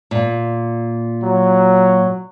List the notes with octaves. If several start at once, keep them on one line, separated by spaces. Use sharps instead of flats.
A#2
F#3